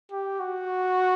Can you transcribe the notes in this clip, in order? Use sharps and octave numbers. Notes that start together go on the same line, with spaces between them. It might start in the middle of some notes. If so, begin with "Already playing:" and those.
G4
F#4